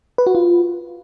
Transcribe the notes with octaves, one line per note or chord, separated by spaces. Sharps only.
B4
F#4
F4